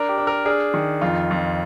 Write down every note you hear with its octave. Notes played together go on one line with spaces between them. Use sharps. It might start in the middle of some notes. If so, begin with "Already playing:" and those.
Already playing: D4 A#4
G4
D4
A#4
D4 G#4
D#3
F2 F4
F2